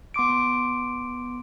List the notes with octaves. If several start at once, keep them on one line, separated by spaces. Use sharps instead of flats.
B3 C6 D6 D7